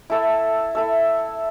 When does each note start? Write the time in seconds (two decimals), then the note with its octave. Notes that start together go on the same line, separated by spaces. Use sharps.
0.10 E4 A4 E5
0.75 E4 A4 E5